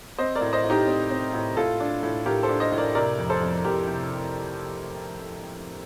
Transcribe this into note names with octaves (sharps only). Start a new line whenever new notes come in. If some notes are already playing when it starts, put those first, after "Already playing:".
C4 C5 D#5
A#4 D5
A2
C5 D#5
A2
D#4 G4
C4
C4
A2
A2 F4 A4
D4
A2
A2 G4 A#4
A4 C5
D4
C5 D#5
A2
A#4 D5
C3 A#4 D5
F2
A4 C5
F2
F2 G4 A#4
C3